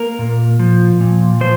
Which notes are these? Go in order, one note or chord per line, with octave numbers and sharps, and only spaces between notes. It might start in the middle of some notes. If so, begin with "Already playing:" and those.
Already playing: A#3 A#4
A#2
F3
A#2
F3 C5